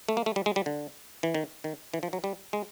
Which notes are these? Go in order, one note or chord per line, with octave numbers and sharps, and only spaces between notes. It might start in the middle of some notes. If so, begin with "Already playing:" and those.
A3
A#3
A3
G3
G#3
G3
D3
E3
D#3
D#3
E3
F3
F#3
G3
G#3